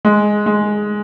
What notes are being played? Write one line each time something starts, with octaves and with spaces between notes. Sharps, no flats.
G#3
G#3